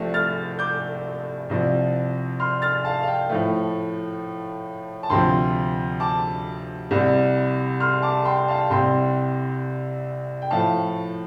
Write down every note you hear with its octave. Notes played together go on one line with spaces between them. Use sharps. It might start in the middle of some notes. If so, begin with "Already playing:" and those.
Already playing: C2 C3 F3 A3
F6 A6
D6 G6
C2 C3 F3
C6 F6
F6 A6
F5 A5
F5
G5
A2 F3 A3
A5
D2 C3 F3 G5 C6
A5 D6
C2 C3 G3
C6 F6
A5 D6
G5 C6
F5 A5
C2 C3 G3 G5 C6
G5
A2 F3 A3 F5 A5